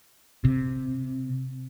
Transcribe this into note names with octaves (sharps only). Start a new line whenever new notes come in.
C3